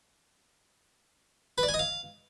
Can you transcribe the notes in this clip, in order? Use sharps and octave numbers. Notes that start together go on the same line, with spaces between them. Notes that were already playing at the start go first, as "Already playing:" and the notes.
B4
D5
G#5
D#5
F5